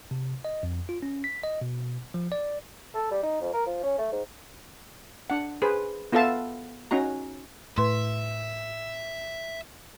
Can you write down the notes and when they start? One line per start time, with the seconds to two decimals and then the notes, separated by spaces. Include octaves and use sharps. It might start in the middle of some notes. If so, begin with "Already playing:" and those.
0.11 C3
0.45 D#5
0.63 F2
0.89 F4
1.02 C#4
1.24 B6
1.43 D#5
1.61 B2
2.14 F3
2.32 D5
2.95 A4
3.11 G3
3.23 D#4
3.41 F2
3.53 A#4
3.66 F3
3.83 C#4
3.98 A3
4.12 G#2
5.30 D4 F#5
5.62 G#4 B4 C5
6.12 B3 F4 A4 E5 F5 A5
6.91 C#4 D#4 F#4 A#5
7.78 A2 B4 E5 C6